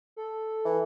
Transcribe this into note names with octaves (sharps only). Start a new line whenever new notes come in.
A4
E3